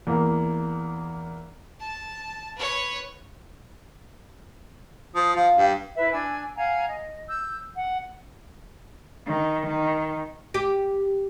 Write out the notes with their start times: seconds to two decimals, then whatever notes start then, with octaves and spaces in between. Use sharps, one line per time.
0.07 E2 A#3
1.80 A5
2.56 B4 C#5
5.15 F3 D#6
5.35 F3 F5
5.57 G2
5.97 E4 B4 E5
6.12 D4 G#5 E6
6.57 F5 F#5 G#5 A#5
6.88 D#5
7.28 E6 G6
7.75 F#5
9.26 D#3
9.67 D#3
10.54 G4